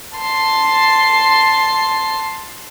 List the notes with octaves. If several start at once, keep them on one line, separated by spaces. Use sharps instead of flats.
A5 C6